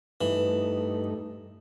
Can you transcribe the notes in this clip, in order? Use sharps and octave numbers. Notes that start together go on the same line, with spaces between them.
G2 E3 A3 D#4